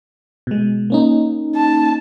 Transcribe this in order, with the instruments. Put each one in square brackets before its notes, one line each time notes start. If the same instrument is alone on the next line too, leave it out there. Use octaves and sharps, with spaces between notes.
[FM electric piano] B2 G#3
A#3 C#4 D#4
[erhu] A5